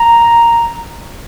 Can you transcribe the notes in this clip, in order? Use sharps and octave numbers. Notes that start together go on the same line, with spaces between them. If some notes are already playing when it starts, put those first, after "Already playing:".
Already playing: A#5